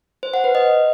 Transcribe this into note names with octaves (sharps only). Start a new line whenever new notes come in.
C5
F#5
B4
D#5